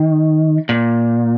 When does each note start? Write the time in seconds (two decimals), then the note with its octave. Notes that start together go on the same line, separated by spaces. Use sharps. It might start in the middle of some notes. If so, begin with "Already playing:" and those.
Already playing: D#3
0.69 A#2